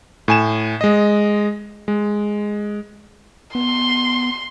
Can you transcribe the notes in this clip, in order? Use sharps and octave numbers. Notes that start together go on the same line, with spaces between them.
A2 G#5 E7
G#3 D#5
G#3
B3 C6